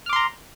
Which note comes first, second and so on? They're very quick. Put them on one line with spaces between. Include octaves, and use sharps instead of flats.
F6 D6 C6 A#5